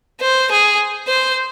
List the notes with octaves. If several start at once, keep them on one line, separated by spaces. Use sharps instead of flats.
C5
G#4
C5